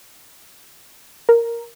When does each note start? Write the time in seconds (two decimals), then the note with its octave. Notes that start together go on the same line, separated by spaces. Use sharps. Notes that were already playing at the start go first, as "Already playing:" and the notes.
1.29 A#4